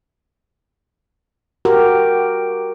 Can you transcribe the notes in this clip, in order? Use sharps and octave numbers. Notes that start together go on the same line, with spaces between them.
F#4 G4 A#4